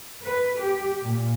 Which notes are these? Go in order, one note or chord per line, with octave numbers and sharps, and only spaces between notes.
B4
G4
A#2